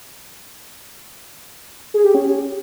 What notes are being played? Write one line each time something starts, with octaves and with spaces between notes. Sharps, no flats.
G#4
G4
C#4